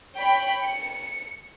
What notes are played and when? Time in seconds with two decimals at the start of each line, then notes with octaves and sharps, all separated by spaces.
0.17 C#5 G5 B5
0.64 C#7